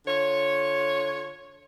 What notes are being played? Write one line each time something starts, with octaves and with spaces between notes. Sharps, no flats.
D3 F4 C#5